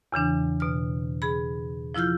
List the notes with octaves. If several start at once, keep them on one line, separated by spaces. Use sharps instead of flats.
E2 C#3 E3 D4
B2 F6
G#4 B5
F3 E4 F4 F6 G6